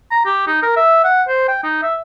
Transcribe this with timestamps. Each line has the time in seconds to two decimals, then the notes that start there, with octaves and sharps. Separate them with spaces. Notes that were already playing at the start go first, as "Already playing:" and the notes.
0.11 A#5
0.25 G4
0.47 D#4
0.63 A#4
0.76 E5
1.04 F#5
1.28 C5
1.48 G5
1.64 D#4
1.82 E5